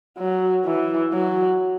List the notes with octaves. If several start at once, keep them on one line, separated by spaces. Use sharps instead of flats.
F#3
E3
F#3